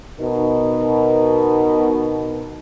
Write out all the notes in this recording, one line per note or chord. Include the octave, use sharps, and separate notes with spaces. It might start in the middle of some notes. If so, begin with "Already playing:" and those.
B2 D#4 A#4